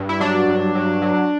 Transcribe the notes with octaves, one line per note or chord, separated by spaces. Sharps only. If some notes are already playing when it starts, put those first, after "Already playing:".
Already playing: G2
E4
F#3 D4
G2
F#3
F#3